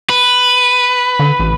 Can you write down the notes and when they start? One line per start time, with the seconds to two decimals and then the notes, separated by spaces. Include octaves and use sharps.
0.10 B4
1.19 D3
1.40 A1